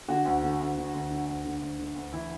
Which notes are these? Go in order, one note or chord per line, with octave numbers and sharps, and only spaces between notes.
D3 F#4
D2
D3
D2
D3
D2
D3
D2
D3
D2
D3
D2
E3 E4